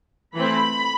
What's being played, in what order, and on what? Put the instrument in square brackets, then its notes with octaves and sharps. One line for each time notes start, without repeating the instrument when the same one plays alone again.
[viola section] E3 A3 C4 B5